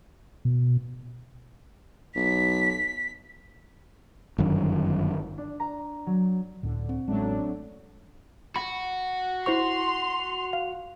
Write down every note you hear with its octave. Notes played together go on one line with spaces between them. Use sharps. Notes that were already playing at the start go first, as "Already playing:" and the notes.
B2
B1 B6
G1 F#2 D#3
D4
A#5
F#3
C#2 A2 D3
C4
A1 F#3 G#3 A3 C#4 D4
F#4 B5
E4 C5 C6 C#6 F7
F5